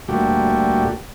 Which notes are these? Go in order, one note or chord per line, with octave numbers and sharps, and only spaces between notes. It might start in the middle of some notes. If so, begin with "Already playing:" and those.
D2 A#2 G3 A3 F#4 G4